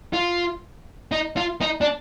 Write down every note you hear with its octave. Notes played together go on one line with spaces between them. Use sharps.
F4
D#4
F4
D#4
D4